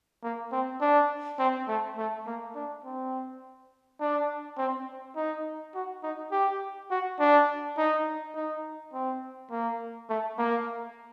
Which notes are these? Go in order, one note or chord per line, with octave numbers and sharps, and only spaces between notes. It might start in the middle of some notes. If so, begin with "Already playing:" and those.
A#3
C4
D4
C4
A3
A3
A#3
D4
C4
D4
C4
D#4
F#4
D#4
G4
F#4
D4
D#4
D#4
C4
A#3
A3
A#3